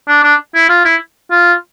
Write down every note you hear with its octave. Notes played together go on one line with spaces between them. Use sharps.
D4
D4
E4
F4
E4
F4